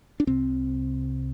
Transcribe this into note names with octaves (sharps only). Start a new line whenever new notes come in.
D4
C2 C3 C4